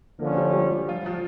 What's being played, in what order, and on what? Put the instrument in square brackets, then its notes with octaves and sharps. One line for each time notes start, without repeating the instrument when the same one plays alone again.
[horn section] D3 F3 C#4 [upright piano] A#3 A#4
[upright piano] G3 G4
G3 G4
G3 G4
F3 F4
F3 F4